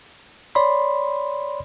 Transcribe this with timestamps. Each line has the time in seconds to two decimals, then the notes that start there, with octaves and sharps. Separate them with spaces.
0.55 C#5 D5 B5 C6